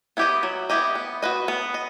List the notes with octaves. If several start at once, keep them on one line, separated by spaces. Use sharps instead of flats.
B3 E4 G4 D#5
F#3
B3 E4 G4 D#5
B3
F#4 B4 D#5
B3
D#5